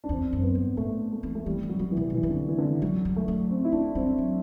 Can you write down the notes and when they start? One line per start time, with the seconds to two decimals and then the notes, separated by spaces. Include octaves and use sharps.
0.04 D4
0.09 E2 C4
0.33 F#2 C4
0.43 B3
0.55 G2
0.77 A2 A3
1.12 A3
1.23 E3
1.35 A3
1.46 E3 G3
1.63 D3
1.69 F#3
1.79 C3 F#3
1.92 E3
1.97 C3
2.10 B2 E3
2.23 C3
2.30 D3
2.48 E3
2.58 D3
2.64 E3
2.81 D3 F#3
3.05 G3
3.16 A3
3.28 F#3
3.50 C4
3.65 E4
3.72 A3 D4
3.95 G3 C4
4.18 F#3